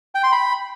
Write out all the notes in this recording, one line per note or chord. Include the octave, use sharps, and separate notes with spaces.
G5
C6
B5